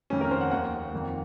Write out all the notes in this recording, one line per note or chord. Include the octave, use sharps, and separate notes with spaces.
F2 D#3 A3 C#4
A#4
C5
F#5
D#2 D#3 A#3 F#5
F2 D#3 A#3